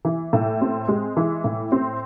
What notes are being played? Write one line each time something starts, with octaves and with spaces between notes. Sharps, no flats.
E3
A2
C4
G#3
E3
A2
C4